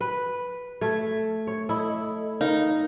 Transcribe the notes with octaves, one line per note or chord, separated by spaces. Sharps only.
B4
A3 G#6
C#5
E4 A4 D#5
D#4 A#4 F5